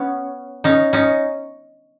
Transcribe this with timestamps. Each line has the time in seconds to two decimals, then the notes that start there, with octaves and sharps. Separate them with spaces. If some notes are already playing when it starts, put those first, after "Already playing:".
Already playing: B3 C#4
0.64 C#4 D#4
0.93 C#4 D#4